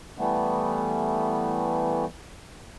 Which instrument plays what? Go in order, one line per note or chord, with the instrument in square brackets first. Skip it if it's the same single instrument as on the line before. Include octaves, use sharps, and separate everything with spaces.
[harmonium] E3 G3 A3 B3